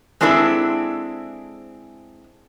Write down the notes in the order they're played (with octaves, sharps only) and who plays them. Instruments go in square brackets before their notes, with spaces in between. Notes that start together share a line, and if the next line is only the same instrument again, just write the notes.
[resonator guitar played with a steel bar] G#3 C4 D4 E4 G#4 A4